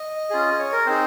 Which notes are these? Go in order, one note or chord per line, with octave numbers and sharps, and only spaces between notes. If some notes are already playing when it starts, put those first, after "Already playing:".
Already playing: D#5
C#4 F4 G#4
C#5
A#4
C4 D#4 G#4 C5